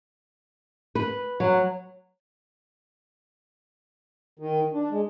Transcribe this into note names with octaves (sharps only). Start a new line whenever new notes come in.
B4
F#3
D#3
D4
G#3